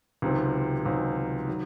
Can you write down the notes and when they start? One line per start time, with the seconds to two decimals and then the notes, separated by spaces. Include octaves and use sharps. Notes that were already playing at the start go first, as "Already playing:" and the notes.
0.22 C#2 C3 D#3 F#3 C4
0.85 C#2 C3 D#3 F#3 C4
1.47 D#3 F#3